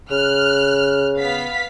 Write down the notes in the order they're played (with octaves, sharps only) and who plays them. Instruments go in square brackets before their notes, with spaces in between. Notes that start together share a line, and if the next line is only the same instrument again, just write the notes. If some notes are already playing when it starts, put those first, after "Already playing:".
[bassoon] C#3 [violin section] F6 F#6
[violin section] B3 F5 B6